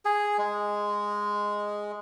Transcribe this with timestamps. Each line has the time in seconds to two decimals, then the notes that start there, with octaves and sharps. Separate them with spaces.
0.05 G#4
0.38 G#3